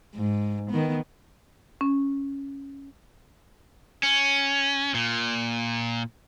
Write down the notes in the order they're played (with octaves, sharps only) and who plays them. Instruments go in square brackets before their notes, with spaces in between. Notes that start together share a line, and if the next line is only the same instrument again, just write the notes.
[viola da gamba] G#2
D#3 B3
[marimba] C#4
[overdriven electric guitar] C#4
A#2